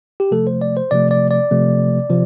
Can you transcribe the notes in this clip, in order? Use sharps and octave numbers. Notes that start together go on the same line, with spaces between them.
G4
C3 F3 A3 A4
C5
D5
C5
C3 F3 A3 D5
D5
D5
C3 F3 A3
C3 F3